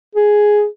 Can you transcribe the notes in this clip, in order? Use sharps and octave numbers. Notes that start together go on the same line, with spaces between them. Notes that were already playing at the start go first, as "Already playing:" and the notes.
G#4